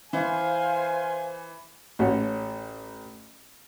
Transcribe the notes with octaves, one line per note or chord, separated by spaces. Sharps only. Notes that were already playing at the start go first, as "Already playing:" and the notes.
E3 C5 F5 G#5
A1 F#4 C#5